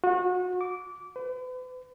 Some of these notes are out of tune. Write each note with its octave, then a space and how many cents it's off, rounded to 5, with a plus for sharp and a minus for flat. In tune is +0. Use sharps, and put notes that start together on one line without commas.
F#4 -30
D6 -20
B4 +40